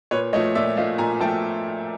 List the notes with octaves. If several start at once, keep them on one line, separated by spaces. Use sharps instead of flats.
A#2 B4 C#5
F3 A3 C#5 D#5
A#2 D5 E5
F3 A3 D#5 F5
A#2 G#5 A#5
F3 A3 G5 A5